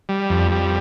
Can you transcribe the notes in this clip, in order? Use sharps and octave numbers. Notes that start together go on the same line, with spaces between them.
G3
F2
G3